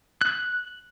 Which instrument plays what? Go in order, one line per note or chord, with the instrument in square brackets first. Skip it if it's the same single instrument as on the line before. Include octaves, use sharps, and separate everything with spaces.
[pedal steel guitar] F#6